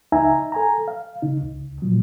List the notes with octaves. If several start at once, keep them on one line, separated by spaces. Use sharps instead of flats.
C#2 D#4 E5 G#5 A#5
A4 G#5 A#5
F5
C#3 D#4
C#2
A#2 F3 F#3